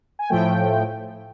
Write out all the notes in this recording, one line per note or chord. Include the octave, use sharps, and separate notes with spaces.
G#5
A2 F3 A3 G5